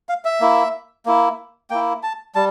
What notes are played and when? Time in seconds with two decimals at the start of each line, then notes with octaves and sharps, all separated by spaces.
0.09 F5
0.25 E5
0.41 A#3 E4
1.06 A#3 E4
1.70 A#3 E4 G5
2.03 A5
2.35 G3 A5